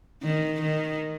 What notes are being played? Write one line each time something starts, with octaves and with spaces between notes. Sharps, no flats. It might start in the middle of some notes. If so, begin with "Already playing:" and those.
D#3
D#3